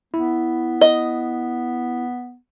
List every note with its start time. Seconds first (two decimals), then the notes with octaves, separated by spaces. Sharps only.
0.14 B3 E4
0.81 D#5